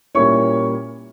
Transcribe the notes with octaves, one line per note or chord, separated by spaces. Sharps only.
A#2 G3 A#3 C#4 E4 C#5 C#6